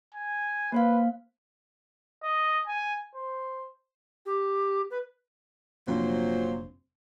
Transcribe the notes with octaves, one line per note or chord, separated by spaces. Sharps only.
G#5
A#3 B4 C5 F5
D#5
G#5
C5
G4
B4
F1 A#2 F#3 C4 D4 C5